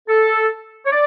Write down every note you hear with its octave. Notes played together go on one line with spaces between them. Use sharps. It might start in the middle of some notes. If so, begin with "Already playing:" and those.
A4
C#5
D5